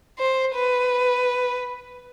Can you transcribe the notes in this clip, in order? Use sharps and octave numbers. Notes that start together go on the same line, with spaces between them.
C5
B4